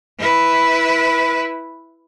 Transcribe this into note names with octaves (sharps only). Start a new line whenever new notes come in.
E4 B4